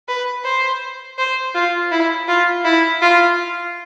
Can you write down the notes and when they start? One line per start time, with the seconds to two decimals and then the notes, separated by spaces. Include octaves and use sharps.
0.08 B4
0.44 C5
1.18 C5
1.55 F4
1.92 E4
2.28 F4
2.65 E4
3.02 F4